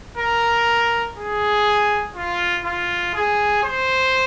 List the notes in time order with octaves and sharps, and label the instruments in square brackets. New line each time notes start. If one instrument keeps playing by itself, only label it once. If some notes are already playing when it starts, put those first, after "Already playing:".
[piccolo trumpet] A#4
G#4
F4
F4
G#4
C5